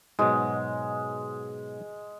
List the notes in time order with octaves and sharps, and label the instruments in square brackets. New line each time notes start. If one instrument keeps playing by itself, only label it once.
[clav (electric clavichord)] G#2 B2 F#3 [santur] G#3